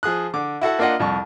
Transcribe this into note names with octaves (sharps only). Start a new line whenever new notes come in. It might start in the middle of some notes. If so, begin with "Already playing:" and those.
F3 G#4 D#6 F#6
D3 D6
E4 F#4 A4 F#5
A#3 D4 F4 D#5 F#5
C2 F2 C#6